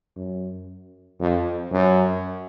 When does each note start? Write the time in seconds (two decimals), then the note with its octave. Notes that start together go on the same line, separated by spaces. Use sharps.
0.16 F#2
1.20 F2
1.71 F#2